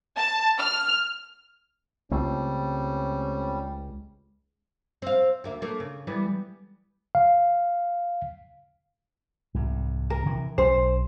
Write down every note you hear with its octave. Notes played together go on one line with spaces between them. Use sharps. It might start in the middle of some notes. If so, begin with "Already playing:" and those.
A5
F6
C#2 G3 A3 C4 C#4
C4 F5
D2 A#3 E5
A3 A#3
C#3
E3 G3 B3
F5
C2 G#2
A#4
C3 E3
B1 F#3 C#4 C5